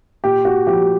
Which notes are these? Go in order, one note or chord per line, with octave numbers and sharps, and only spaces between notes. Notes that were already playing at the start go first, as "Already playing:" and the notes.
A#2 G4
F#4
F3 G4